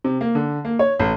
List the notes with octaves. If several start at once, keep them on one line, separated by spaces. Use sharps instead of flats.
C3
A#3
D3
A#3
C#5
A1